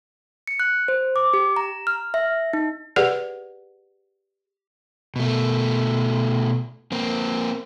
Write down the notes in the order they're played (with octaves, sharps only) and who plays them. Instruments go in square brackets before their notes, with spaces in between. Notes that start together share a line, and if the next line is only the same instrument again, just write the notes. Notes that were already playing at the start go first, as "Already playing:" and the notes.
[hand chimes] C#7
F#6
C5
D6
G4
A#5
F6
E5
D#4
[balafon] G4 G#4 B4 D5 F#5
[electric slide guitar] B2 A3
A#3 C4